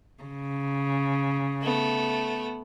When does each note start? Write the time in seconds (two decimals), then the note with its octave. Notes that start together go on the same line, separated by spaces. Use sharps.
0.23 C#3
1.62 A3 B3